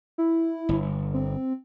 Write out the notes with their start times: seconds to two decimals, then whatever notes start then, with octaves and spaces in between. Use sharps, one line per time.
0.18 E4
0.69 G1
1.14 C4